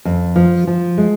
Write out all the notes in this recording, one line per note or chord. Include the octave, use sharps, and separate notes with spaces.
F2
F3
F3
G#3